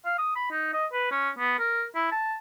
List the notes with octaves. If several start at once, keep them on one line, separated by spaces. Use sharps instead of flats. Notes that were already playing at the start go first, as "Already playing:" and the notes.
F5
D#6
B5
D#4
D#5
B4
C#4
B3
A#4
E4
A5